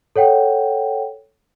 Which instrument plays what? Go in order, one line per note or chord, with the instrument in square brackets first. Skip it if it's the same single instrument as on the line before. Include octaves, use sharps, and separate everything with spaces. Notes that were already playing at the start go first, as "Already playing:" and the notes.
[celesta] A4 C#5 F#5 G5